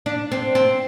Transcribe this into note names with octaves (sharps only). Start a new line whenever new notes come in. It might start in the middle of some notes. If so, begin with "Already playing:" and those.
D4
C4
C4